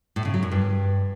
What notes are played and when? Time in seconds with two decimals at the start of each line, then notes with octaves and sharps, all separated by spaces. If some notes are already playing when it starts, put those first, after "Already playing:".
0.16 A2
0.25 C#3
0.34 F#3
0.43 F#2
0.51 G2